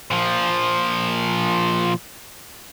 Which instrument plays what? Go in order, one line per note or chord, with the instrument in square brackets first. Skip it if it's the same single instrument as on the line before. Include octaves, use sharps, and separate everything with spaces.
[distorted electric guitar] A#2 F3